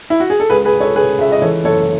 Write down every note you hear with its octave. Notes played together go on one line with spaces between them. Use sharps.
E4
F#4
G#4
A4
C#2 G#4 B4
G#4 B4
C#2
A4 C#5
C#3 G#4 B4
C#2 E5
D#5
E3 A4 C#5
F#1 A4 C#5